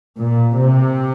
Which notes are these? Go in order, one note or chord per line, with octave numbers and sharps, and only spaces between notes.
A#2
C3